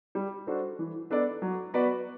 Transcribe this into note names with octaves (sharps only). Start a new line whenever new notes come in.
G3
D4 F#4 A4 C5
E3
B3 D4 A4 D5
F#3
B3 F#4 B4 D5